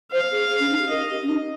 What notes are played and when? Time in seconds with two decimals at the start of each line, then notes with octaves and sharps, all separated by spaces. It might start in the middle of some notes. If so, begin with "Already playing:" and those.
0.11 C5 F5
0.31 G#4
0.50 G#4
0.60 C#4
0.70 D#4
0.79 G4
0.89 A#4 D#5
1.10 G4
1.22 C#4
1.28 D#4